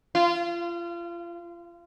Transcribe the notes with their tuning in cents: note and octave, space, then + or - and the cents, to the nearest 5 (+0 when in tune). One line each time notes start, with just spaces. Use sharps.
F4 -30